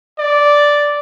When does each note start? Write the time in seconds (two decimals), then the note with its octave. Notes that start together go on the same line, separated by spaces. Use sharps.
0.19 D5